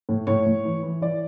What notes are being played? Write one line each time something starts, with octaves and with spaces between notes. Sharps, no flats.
A2
A2 C#5
A2
E3
E3
E3 D5